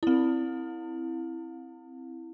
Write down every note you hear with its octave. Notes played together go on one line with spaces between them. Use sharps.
C4 E4